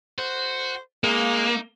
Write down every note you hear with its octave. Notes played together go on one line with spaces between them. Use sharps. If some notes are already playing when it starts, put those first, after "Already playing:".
F#4 C5
G#3 A#3 D#4